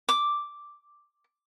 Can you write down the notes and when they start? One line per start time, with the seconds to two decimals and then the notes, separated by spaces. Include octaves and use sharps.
0.09 D6